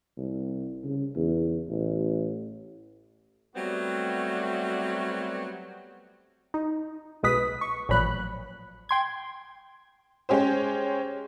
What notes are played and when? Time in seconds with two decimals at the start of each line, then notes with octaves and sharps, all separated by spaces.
0.17 C2
0.84 C#3
1.15 E2
1.68 A1
3.55 F#3 G3 A3 B3 C4 F#4
6.54 D#4
7.23 B1 B2 G#3 B4 D#6 B6
7.61 C#6
7.89 A1 A#2 F3 F#3 B5 F#6
8.89 G5 C6 G#6
10.29 G#3 C#4 G4 C5